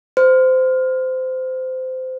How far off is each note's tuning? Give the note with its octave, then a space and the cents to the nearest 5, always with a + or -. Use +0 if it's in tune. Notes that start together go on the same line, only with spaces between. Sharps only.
C5 -20